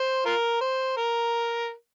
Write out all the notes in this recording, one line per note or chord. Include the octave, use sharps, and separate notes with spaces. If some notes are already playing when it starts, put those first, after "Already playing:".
Already playing: C5
F4 A#4
C5
A#4